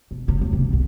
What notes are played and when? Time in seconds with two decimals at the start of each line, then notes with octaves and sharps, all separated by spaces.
0.11 B2
0.28 C#3
0.41 E2
0.53 C3
0.73 B1